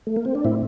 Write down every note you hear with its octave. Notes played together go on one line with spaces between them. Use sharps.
A3
A#3
C4
D4
A2 C4 E4